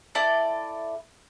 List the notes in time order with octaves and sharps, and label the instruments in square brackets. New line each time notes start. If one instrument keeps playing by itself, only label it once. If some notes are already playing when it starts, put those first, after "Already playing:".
[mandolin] E4 A4 D5